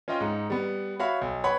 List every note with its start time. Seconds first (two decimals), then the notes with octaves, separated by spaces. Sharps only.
0.08 C#4 F4 D#5 F5 G5
0.21 G#2 D#4
0.50 G3 B3
1.00 F#4 C#5 E5 F5 B5
1.21 B1
1.44 B4 C#5 F#5 G5 B5